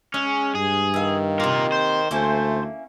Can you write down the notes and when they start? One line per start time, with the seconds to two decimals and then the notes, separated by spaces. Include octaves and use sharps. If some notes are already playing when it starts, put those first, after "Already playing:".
0.14 G#3 C#4
0.55 G2 G#4
0.94 D#3 E4 F5
1.40 C3 A#3 F4 A#4
1.72 C5
2.11 D2 A3 A#3 C#4 E4